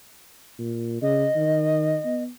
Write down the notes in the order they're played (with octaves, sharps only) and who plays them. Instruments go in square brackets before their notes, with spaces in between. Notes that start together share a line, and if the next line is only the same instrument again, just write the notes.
[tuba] A#2
[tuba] C#3 [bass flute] D#5
[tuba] D#3
B3